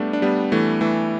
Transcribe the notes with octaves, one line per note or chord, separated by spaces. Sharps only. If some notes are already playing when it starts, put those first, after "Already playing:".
Already playing: G3 A3 B3 D4
D4
G3 B3
E3 A3
E3 A3